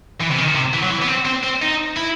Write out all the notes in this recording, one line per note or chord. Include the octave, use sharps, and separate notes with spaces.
E3
C3
D#3
C3
E3
F#3
E3
B3
C4
C4
C4
D#4
E4